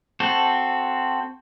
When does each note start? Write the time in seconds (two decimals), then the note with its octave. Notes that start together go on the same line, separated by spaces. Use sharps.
0.20 C4 F#4 A4